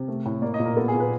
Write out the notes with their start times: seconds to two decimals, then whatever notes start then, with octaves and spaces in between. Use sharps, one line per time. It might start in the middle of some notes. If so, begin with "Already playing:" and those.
Already playing: C3
0.08 A3
0.25 A2
0.42 A#3 D5
0.54 D#5
0.59 A#2
0.66 A#4
0.76 B3 A4
0.88 G#4
0.94 A#2
1.00 B4